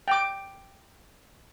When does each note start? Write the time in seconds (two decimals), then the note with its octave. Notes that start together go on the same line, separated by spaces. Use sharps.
0.08 G5 D6